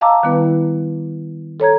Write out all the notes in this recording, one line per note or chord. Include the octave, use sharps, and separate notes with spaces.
D#5 F5 A5 A#5 D6 E6
D#3 G3 B3 E4 B4
A4 C#5 A#5 G#6